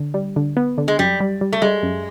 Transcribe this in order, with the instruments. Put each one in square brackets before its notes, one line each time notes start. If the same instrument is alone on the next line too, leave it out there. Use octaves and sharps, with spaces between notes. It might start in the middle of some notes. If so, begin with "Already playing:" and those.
Already playing: [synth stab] D3
G3
D3
B3
D3
[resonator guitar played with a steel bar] G#3
[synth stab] F#2 [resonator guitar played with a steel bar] G3
[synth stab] G3
G3
[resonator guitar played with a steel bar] A3
[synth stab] G3 [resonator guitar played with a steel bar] G#3
[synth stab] F#2